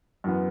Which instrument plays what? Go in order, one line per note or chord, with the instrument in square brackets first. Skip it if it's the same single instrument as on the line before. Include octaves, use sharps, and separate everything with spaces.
[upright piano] F#2 E3 B3